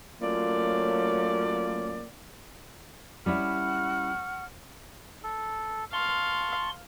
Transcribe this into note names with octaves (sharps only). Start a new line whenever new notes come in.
F#3 A3 A#3 C#4 F4 D5
G3 C#4 E4 F#5 C#6 F6
A4
F5 A5 C6 C#6